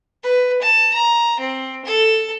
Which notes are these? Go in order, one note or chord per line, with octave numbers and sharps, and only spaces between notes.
B4
A5
A#5
C4
A4